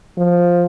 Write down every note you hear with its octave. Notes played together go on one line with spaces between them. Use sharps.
F3